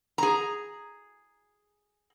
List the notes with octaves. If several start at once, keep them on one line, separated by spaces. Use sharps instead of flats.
G#4 A#5